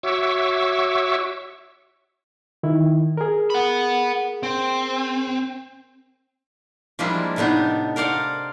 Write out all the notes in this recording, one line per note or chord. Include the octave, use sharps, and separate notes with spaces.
F#4 C#5 E5 C#6 D6 E6
D#3 E4
G#4 A#4
F#5 B5
C4
F3 G3 G#3 A#3 D4 E4
A2 C3 B3 D4 D#4
A#4 C5 D5 F5 F#5